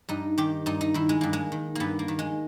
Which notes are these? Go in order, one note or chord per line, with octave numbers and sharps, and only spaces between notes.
G2 D#4
D#3 G4
G2 D#4
D#4
D#3 E4
G#3
G2 A#3
G#3
D#3
G2 A#3 B3
A#3
D#3
G#3